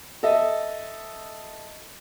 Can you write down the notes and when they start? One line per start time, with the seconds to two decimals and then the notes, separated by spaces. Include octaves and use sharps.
0.23 A4 D#5 E5